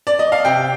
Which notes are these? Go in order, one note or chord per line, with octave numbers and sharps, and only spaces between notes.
D5
D#5
F5
C3 G5